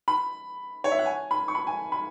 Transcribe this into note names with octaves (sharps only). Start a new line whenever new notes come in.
B5
C#5
E5
F#5
G#5
B5
C#6
B5
G#5
B5